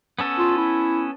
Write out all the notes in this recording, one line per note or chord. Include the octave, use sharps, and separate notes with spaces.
B3 C#4 A4
F4
E4